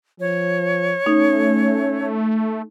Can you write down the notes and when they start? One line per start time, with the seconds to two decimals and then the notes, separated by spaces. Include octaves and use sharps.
0.20 F3 C#5
1.06 A3 C#4 D#4